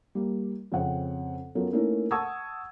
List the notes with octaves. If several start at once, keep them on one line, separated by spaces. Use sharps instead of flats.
G3 A#3
F2 C#3 C4 F#5
F#3 B3 C#4 F4 A4 A#4
A3 A#3 C#4 D#4 E4 A#4
F#5 A5 C#6 D#6 E6 G#6